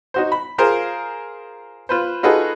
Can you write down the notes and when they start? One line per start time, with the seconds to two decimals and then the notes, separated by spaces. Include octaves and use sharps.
0.14 D#4 F#4 C5
0.32 B5
0.58 F4 G#4 A#4 C5 F5
1.89 F4 B4 C5
2.23 D#4 F4 F#4 G#4 A4 B4